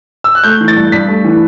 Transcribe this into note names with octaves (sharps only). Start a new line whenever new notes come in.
E6
F#6
A3 G6
E3
A6
G2
G2 B6
A3
E3